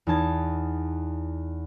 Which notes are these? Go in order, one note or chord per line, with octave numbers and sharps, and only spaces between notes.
E2 D#4 A5 G#6